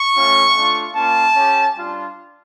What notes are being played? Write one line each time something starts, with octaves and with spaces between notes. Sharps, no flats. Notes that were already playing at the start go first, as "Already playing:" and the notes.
Already playing: C#6
A3 C#4 F4
A3 D4 F4
A#3 C#4 F4 A5
C#4 G4
G3 D4 F4